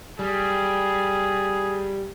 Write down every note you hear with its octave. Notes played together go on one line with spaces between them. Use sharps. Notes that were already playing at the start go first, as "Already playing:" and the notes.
G3 G#4